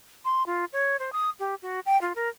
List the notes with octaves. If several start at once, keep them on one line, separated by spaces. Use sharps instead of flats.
C6
F4
C#5
C5
D#6
G4
F#4
G5
F4
A#4